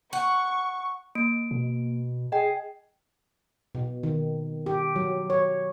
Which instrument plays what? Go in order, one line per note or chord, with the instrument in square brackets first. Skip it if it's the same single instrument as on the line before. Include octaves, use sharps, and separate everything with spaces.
[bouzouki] F#5 [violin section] C#6
[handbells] A#3 D7
[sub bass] B2
[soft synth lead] G#4 [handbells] D#5 G5
[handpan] B2
D#3
G4
F#3
C#5